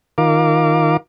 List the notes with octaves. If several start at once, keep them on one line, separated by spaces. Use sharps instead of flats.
D#3 F4 A#4 F5 D6